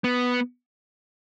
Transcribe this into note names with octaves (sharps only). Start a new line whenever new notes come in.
B3